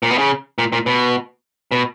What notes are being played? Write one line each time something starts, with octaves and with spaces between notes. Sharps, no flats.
A#2
B2
C#3
A#2
A#2
B2
B2